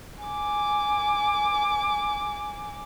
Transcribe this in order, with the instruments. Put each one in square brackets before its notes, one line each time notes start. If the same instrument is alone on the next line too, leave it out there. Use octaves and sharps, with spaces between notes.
[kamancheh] G#5 D6